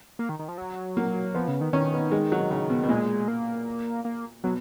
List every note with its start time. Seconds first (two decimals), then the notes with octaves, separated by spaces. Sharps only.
0.19 A#3
0.29 D#3
0.39 D#3
0.48 F3
0.58 F#3
0.97 A#3
1.34 F3 B3
1.48 C#3
1.61 D#3
1.73 D#3 C#4
1.93 B3
2.12 G#3
2.32 F#3
2.51 C#3
2.70 B2
2.83 B2
2.89 A#2 G#3
3.28 A#3
4.05 A#3
4.44 B2 F#3